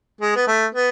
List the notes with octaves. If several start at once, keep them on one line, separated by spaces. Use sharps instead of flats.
G#3
B3
A3
B3